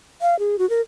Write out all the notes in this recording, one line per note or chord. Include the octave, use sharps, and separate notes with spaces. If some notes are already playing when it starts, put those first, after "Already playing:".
F5
G#4
F#4
A#4